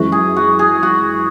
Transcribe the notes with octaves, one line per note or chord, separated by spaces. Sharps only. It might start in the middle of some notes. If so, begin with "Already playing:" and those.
Already playing: F#2 E3 G#3 E4 F#4
G#4
F#4
G#4
F#4